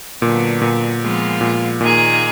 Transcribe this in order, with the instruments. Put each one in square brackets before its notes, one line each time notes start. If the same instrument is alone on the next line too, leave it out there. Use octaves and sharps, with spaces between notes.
[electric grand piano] A#2 [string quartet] D3 F#3 B3
[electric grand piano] A#2
[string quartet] F3 G#3 B3 F4
[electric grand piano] A#2
[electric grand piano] A#2 [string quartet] D#3 A#3 D#4 G#4